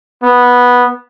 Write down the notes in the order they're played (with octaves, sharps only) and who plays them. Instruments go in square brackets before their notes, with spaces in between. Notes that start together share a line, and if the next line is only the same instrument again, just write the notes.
[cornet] B3